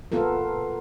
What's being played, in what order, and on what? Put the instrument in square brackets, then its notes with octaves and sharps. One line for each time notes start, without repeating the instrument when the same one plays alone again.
[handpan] B3 F4 A4 A#4